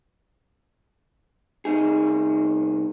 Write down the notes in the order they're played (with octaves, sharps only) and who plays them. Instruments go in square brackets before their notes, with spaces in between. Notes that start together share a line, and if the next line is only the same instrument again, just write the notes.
[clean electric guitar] C2 D#4 G#4